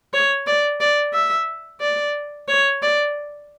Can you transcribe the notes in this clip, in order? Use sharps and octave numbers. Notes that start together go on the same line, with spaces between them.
C#5
D5
D5
E5
D5
C#5
D5